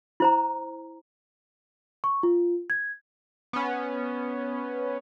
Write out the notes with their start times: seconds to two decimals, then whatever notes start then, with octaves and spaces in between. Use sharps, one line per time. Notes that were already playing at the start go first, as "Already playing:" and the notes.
0.20 E4 C5 A#5
2.04 C#6
2.23 F4
2.70 G#6
3.53 B3 C#4